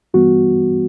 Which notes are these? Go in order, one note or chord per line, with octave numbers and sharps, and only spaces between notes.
G2 E3 G3 B3 F#4